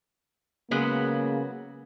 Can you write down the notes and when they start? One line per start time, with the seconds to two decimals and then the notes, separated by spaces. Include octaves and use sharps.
0.71 C#3 F#3 G#3 A#3 B3